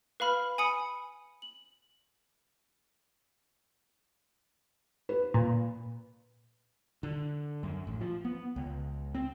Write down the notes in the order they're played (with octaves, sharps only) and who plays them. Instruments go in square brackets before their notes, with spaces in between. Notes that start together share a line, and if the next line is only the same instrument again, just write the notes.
[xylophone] B4 F5 B5 F6
G#5 B5 D#6 C#7
F#7
[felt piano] B4
[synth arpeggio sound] A#2
[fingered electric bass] D3
F#2
A1
F3
B3
C#2
C4